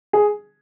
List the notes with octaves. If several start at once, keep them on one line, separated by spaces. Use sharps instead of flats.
G#4